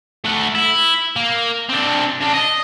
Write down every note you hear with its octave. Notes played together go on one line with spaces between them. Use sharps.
A3 F#5
E4
A#3
C4 D4
C#3 D4
D#5